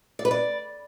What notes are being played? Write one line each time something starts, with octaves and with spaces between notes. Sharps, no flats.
D5
B4
D5